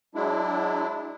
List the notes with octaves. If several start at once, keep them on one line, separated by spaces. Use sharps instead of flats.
F#3 G#3 D4 E4